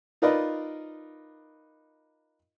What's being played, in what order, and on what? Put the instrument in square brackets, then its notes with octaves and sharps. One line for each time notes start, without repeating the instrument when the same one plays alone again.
[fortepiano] D#4 F4 A#4 B4 D5 D#5